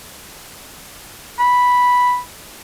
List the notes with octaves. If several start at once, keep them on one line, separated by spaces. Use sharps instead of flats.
B5